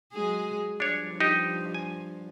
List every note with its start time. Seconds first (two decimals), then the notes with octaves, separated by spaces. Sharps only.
0.13 F#3 G#3 G#4
0.80 G2 F3 D4 C#5
1.20 D#4 G4
1.74 G#5